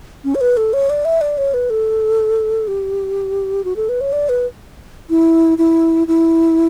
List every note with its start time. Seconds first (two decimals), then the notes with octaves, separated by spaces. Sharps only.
0.24 C#4
0.35 C#5
0.41 B4
0.57 A4
0.73 C#5
0.90 D5
1.05 E5
1.21 D5
1.38 C#5
1.54 B4
1.70 A4
2.68 G4
3.64 F#4
3.76 A4
3.89 B4
4.01 C#5
4.13 D5
4.29 B4
5.10 E4
5.58 E4
6.07 E4